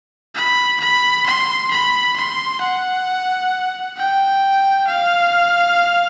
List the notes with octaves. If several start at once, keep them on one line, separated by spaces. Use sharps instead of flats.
B5
B5
C6
B5
C6
F#5
G5
F5